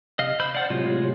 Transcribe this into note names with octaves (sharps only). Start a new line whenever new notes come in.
C3 D#5 F5
C5 B5 E6 G6
C5 D5 F5 F#5 A5
A2 C3 F#3 G#3 F4